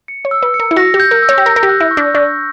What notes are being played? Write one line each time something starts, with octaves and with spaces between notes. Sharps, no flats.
C#7
C#5
E6
B4
C#7
A#4
E4
F#4 A#6
G4
G6
A#4
E6
C#5
G4
A#4 A#6
A#4
G4
F#6
E4
C#6
D4
D4 C#6